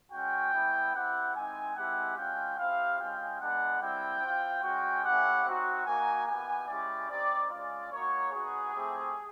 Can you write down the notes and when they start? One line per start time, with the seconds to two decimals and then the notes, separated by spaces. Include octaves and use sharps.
0.12 G#3 C#4 F#4 G5
0.53 G3 B3 E4
0.94 C4 E4 G4 F#5
1.35 G#3 C4 D#4 G#5
1.76 G#3 C4 E4 G4 F#5
2.17 G#3 C#4 F4 G5
2.58 C4 E4 G4 F5
2.99 G#3 C#4 F4 G5
3.40 G#3 B3 D4 F#5
3.82 G3 C4 E4 G5
4.22 C4 F4
4.63 G#3 C#4 F#4 G5
5.04 A3 C#4 E4 G4 F#5
5.46 C4 D#4 F#4
5.86 A#3 D#4 F#4 G#5
6.27 B3 E4 G4 G#5
6.68 G#3 C#4 E4 G4 D5
7.10 C4 D#4 G4 D5
7.50 G#3 C#4 F4 D5
7.91 A#3 D#4 F#4 C#5
8.32 B3 D#4 F#4 G#4
8.73 A3 C4 E4 G4